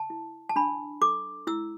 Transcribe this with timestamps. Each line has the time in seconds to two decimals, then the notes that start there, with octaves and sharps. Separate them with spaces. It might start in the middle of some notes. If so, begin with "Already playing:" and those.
Already playing: A5
0.10 E4
0.49 A5
0.56 D4 B5
1.02 A4 D6
1.47 E4 E6